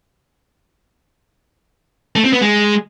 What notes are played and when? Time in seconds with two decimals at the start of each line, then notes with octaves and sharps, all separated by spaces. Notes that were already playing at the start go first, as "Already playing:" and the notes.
2.16 A3
2.24 C4
2.33 B3
2.41 G#3